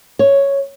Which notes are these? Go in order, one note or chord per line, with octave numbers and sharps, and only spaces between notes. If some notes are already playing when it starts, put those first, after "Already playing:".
C#5